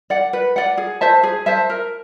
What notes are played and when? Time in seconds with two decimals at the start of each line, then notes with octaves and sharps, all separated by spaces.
0.10 D5 F#5
0.33 B4
0.56 D5 F#5
0.78 G#4
1.01 C5 E5 A5
1.23 G#4
1.46 C5 E5 A5
1.70 A#4